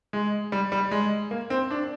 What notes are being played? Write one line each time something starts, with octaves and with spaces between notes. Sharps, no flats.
G#3
G3
G3
G#3
A#3
C4
D4